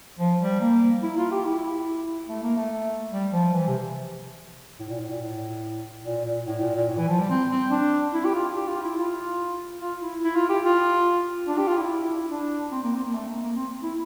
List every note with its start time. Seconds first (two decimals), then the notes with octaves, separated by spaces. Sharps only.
0.19 F3
0.41 G3
0.61 A#3
1.03 E4
1.18 F4
1.31 G4
1.45 E4
2.29 A3
2.43 A#3
2.57 A3
3.12 G3
3.33 F3
3.53 E3
3.67 C3
4.80 A2
4.89 A#2
4.99 A2
5.10 A#2
5.21 A2
6.05 A#2
6.25 A#2
6.46 A2
6.60 A#2
6.74 A#2
6.88 A2
6.98 E3
7.09 F3
7.19 G3
7.30 C4
7.50 C4
7.71 D4
8.13 E4
8.25 G4
8.34 F4
8.55 G4
8.68 F4
8.83 E4
8.97 F4
9.80 F4
10.01 E4
10.22 E4
10.36 F4
10.49 G4
10.64 F4
11.47 D4
11.58 G4
11.67 F4
11.78 E4
12.31 D4
12.72 C4
12.83 A#3
12.94 C4
13.04 A#3
13.14 A3
13.29 A#3
13.42 A#3
13.56 C4
13.83 E4